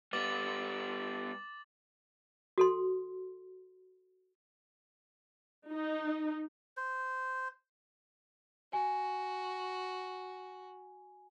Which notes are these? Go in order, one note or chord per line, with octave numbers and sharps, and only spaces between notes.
G3 B3 D6 A6 F#7
F#4 A4 C6
D#4
C5
F#4 G#5